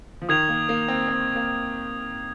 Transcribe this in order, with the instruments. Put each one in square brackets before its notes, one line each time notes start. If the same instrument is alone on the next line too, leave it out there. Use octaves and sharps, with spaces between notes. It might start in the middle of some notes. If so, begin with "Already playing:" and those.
[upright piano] F3
[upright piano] D#3 [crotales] D#6 G#6 F7
[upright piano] A#3
A#3
C4
C4
A#3